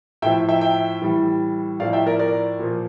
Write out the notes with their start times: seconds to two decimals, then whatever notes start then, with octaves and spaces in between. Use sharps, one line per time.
0.22 A2 F3 E5 G5
0.49 E5 G5
0.61 E5 G5
1.01 A2 E3 G3
1.80 A2 F3 D5 F5
1.93 E5 G5
2.07 A#4 D5
2.19 A#4 D5
2.59 A#2 F3